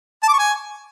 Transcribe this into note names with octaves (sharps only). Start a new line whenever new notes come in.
A5
D6
C#6
G#5